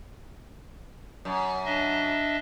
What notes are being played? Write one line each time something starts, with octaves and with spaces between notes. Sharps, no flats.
F#2
D4 D#5 E5